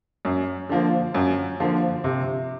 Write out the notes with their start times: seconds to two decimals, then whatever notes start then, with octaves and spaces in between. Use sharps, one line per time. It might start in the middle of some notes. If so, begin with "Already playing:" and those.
0.25 F#2
0.69 D3 F3 A#3
1.15 F#2
1.60 D3 F3 A#3
2.04 C3